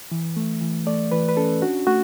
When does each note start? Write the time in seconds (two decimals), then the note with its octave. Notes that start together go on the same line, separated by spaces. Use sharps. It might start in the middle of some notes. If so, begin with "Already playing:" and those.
0.12 E3
0.37 A3
0.61 E3
0.87 A3 D5
1.12 E3 B4
1.29 B4
1.37 C#4 A4
1.62 D4 F#4
1.87 A3 F#4